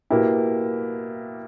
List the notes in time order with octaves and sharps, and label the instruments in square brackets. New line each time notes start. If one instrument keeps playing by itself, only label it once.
[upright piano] B2 A#3 E4 G4